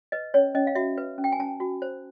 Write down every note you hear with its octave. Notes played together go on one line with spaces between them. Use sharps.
B4 D#5
C#4 C#5
C#4 D#5
F5
F#4 E5
B4
C#4
G5
G#5
C#4 A5
F#4
C5